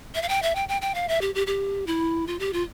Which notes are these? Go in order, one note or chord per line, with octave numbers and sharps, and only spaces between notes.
E5
F5
G5
E5
G5
G5
G5
F5
E5
G4
G4
G4
E4
F4
G4
F4